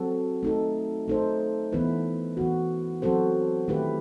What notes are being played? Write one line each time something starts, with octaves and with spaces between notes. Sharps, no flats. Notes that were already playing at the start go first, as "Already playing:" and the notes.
Already playing: F#3 C4 F#4 A4
A3 D#4 A4
A3 D#4 A4 C5
E3 B3 E4 B4
E3 B3 F#4
F#3 C4 F#4 A4 C5
D#3 A3 E4 G4 B4